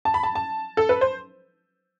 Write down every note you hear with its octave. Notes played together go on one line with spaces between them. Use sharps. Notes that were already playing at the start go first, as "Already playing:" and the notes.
A5
B5
A5
A5
A4
B4
C5